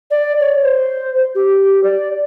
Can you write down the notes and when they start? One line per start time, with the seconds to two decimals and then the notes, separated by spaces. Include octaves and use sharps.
0.11 D5
0.40 C#5
0.63 C5
1.35 G4
1.84 D5